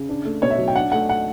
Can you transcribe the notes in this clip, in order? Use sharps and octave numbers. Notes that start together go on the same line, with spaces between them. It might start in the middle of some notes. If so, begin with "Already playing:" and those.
Already playing: C#3
D4
A3
B2 C#5
E5
F#3
G5
D4 F#5
A3 F#5
F#5